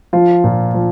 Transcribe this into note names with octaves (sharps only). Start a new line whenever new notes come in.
F3 F4
A#2
F3